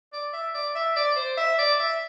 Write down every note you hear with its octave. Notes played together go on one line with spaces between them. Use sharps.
D5
E5
D5
E5
D5
C5
E5
D5
E5